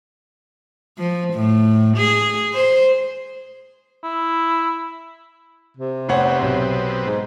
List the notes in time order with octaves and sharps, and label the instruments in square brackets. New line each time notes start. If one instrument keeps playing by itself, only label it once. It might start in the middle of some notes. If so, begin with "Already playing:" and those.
[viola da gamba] F3
A2
G#4
C5
[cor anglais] E4
[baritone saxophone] C3
[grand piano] F1 C#5 F#5 [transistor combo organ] B3 C4
[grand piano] B1
[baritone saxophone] G#2